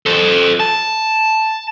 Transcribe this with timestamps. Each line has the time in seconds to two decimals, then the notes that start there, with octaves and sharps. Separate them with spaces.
0.06 A4 C5
0.60 A5